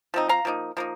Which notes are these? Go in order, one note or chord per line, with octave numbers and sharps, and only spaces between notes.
F3 C4 D#4
F5 A#5
F3 A#3 D#4
F3 A#3 D#4